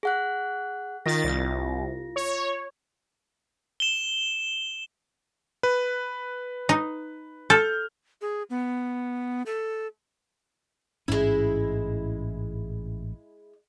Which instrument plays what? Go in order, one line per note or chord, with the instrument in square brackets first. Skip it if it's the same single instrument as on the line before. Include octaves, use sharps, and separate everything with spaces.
[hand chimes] G#4 F#5 F#6
[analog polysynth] D#3 A6 [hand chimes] F4 A#6
[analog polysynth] C2
C#5
[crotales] E7 G7
[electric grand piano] B4
[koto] D#4
[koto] A4 [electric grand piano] F6 G6
[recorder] G#4
B3
A4
[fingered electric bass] A1 G#2 C#4 [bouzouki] G#3 E4